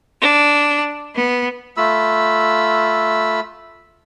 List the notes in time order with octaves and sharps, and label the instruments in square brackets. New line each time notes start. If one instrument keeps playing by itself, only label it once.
[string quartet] D4
B3
[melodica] A3 F4 B5 E6